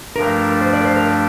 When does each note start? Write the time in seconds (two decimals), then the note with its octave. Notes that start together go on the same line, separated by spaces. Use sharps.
0.16 G2 F3 A3 D4 A#4
0.61 C5
0.73 D5
0.81 A#4
0.84 C5
0.96 A#4
1.07 D5